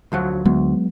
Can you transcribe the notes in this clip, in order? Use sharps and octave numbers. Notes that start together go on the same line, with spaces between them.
D2 F3 F#3
D2 F#3 G#3 B3